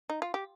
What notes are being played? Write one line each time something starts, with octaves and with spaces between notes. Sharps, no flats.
D#4
F4
G4